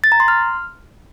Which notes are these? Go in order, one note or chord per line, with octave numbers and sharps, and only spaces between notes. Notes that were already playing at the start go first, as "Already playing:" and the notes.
A6
A#5
C6
F6